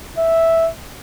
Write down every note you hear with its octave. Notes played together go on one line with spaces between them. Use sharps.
E5